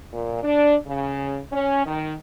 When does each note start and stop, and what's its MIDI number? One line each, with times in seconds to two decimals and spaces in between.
0.13 0.43 46
0.43 0.75 62
0.87 1.40 49
1.52 1.84 61
1.85 2.13 51